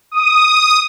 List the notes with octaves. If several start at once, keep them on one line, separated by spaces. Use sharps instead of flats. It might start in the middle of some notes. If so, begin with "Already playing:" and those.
D#6